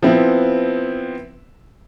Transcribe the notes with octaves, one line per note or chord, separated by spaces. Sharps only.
F3 B3 C4 E4 B4